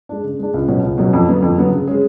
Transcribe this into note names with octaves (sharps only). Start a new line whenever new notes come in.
G#3 D4
C#3
G#3 D4
C#2
B2 F#3 C#4
C#2
B2 F#3 C#4
F2
D3 F#3 B3
F2
D3 F#3 B3
C#3
G#3 C#4 G#4